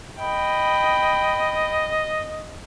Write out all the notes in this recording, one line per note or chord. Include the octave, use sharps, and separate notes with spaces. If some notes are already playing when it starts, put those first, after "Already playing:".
D#5 G5 B5